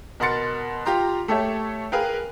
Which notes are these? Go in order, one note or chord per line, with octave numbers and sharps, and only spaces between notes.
B2 A#4 F#5 C6 A6 C#7
F4 G4 A#5 C6
A3 G4 A4 C#5 E5
G#4 A#4 B4 F5 G5